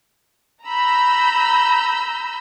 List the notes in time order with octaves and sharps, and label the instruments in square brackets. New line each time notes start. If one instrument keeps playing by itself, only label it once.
[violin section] A#5 B5 E6 G6